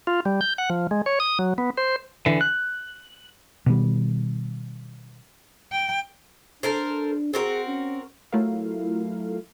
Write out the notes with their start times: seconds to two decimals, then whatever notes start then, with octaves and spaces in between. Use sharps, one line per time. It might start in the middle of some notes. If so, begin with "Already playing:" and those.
0.07 F4
0.25 G3
0.41 G6
0.58 F#5
0.70 F3
0.91 G#3
1.06 C#5
1.20 D#6
1.39 F#3
1.58 B3
1.77 C5
2.26 D3 E3
2.41 F#6
3.66 B2 D#3 G3
5.72 G5
6.63 D4 A4 A#4 C5
7.33 C4 F#4 G#4 A#4
7.68 C#4
8.33 F#3 A3 E4 F4 A#4 F5